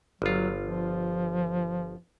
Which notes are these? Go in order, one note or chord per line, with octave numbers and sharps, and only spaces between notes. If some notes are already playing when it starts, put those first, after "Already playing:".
G1 F#3 F4
F3